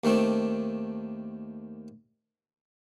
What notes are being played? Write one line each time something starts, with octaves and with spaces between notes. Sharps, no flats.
D#2 D#3 A3 C4 D4